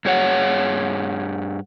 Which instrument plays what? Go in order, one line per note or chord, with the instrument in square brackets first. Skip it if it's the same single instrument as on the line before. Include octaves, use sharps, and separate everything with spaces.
[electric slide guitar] G2 G#4 C#5 F#5